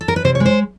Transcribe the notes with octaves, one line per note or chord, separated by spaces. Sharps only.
A4
A#4
B4
C3 C5
C#5
G#3
C5